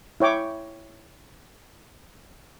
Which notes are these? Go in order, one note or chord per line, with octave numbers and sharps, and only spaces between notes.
E4 C#5 G5 D6